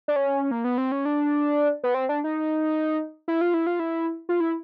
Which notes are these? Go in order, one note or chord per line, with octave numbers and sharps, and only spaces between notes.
D4
C#4
A#3
B3
C4
C#4
D4
B3
C4
D4
D#4
E4
F4
E4
F4
E4
F4
E4